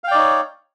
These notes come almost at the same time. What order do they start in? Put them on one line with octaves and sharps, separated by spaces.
F5 G5 D5 D#4 C#5